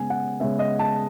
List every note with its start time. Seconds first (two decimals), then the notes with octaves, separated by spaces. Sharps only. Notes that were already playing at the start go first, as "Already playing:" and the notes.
Already playing: C#3 G#3 B3 G#5
0.10 F#5
0.40 C#3 G#3 B3 E5
0.59 D#5
0.79 A5